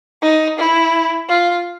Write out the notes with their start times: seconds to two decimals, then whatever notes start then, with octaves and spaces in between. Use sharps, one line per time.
0.22 D#4
0.58 E4
1.29 F4